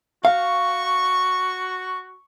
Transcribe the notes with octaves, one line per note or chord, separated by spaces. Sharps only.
F#4 F5 C#6